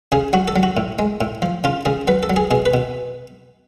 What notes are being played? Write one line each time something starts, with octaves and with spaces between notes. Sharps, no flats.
C#3 G#4
F#3 F#4
A4
F#3
F#4
A2
G#3
A2
F3
C#3 F4
C#3 G#4
F#3 B4
A4
F#3
G#4
B2 G#4
B4
B2